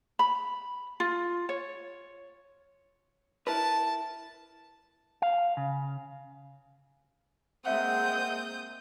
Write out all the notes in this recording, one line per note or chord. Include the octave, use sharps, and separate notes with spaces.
B5
F4
C#5
E4 A#4 B4 A5
F5
C#3
G#3 A#3 C4 E5 F#5 D#6 G6